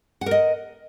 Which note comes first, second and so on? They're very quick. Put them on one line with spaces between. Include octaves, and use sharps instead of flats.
F#5 A#4 D#5